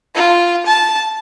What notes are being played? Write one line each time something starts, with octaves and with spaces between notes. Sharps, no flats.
F4
A5